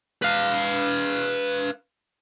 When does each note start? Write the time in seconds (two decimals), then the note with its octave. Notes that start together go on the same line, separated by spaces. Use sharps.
0.22 B4 F5